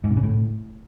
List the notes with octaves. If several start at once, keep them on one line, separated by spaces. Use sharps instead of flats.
G#2
C3
C#3
A2